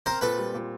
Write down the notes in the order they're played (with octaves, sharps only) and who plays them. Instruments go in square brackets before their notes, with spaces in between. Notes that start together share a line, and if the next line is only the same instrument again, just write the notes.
[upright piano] C4 [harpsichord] A#4 C5
[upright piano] A#2 [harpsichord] A4 B4
[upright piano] G3
A#2